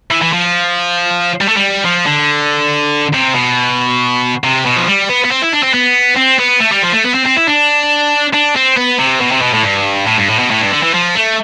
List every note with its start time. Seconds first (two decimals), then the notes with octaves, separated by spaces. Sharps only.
0.11 E3
0.22 E3
0.33 F3
1.41 G3
1.48 A3
1.57 G3
1.84 F3
2.06 D3
3.14 C3
3.35 B2
4.44 C3
4.66 B2
4.76 F3
4.88 G3
5.09 B3
5.25 B3
5.31 C4
5.42 E4
5.53 D4
5.63 C4
5.74 B3
6.17 C4
6.39 B3
6.60 A3
6.72 G3
6.82 F3
6.93 A3
7.04 B3
7.14 C4
7.25 C4
7.36 E4
7.47 D4
8.34 D4
8.56 C4
8.77 B3
8.99 C3
9.21 B2
9.32 C3
9.42 B2
9.54 A2
9.63 G2
10.07 A2
10.18 G2
10.29 A2
10.39 B2
10.51 A2
10.61 G2
10.72 D3
10.83 E3
10.94 F3
11.16 A3